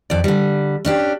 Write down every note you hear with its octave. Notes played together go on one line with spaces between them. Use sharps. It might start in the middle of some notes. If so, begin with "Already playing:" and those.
F2 D5
D3 G3
C#4 D4 G4